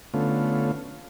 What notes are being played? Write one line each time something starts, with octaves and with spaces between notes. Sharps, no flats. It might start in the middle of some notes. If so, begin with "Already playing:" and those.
D3 A3 B3 C#4 F4